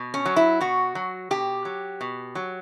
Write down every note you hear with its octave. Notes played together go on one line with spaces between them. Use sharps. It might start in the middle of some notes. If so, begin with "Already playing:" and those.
Already playing: B2
C#4
F#3
E4
B2 F#4
F#3
B2 G4
F#3
B2
F#3